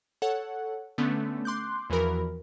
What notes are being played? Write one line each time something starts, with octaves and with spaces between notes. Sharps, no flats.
A4 C#5 F#5
D3 A3 B3 C#4
C6 D6 F#6 G6
E2 E3 F3 F#4 A#4 B5